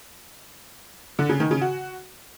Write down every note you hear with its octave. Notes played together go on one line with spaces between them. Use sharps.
D3
C#3
D#3
C#3
F#4